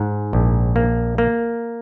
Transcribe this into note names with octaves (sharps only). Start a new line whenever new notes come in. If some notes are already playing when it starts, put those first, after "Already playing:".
Already playing: G#2
A#1
A#3
A#3